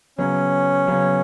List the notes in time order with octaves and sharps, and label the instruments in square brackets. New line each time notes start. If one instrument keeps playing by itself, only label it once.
[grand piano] C#3 F#3 B3 [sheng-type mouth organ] C#4
[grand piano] C#3 F#3 B3